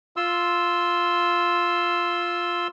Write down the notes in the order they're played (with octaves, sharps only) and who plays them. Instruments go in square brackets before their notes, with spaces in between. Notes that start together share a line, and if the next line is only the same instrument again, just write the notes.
[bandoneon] F4 C6 E6